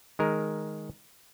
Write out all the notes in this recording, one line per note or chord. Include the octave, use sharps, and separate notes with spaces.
D#3 G#3 A#4